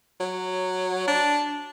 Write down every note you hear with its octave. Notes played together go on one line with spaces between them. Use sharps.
F#3
D4